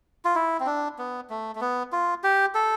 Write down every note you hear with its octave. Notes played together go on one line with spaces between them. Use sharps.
F4
E4
C4
D4
B3
A3
A3
B3
F4
G4
A4